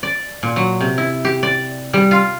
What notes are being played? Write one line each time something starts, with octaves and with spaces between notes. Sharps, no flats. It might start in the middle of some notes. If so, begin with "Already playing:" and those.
D5
A#2
F#3
C3
E4
G4
D5
G3
F4